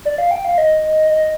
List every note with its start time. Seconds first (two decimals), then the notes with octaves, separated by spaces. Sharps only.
0.05 D5
0.18 F5
0.31 G5
0.45 F5
0.58 D#5
1.11 D#5